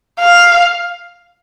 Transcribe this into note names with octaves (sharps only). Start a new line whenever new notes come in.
F5